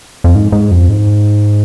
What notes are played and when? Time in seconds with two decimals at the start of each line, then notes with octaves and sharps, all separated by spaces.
0.24 F2
0.35 G#2
0.52 G#2
0.71 F2
0.89 G#2